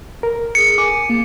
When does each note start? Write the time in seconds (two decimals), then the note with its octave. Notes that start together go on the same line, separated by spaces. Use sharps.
0.23 A#4
0.55 G#4 C#7
0.78 G#5 D6
1.10 A#3